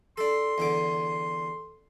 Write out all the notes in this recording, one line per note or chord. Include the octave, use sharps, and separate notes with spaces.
D4 A4 C6
E2 D3 D6